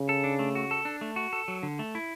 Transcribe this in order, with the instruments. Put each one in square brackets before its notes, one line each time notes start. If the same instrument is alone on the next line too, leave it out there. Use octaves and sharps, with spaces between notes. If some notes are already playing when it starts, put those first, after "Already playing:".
Already playing: [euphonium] C#3
[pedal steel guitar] A4
D4
A3
F#4
A4
D4
A3
F#4
A4
F#3
D3
A3
E4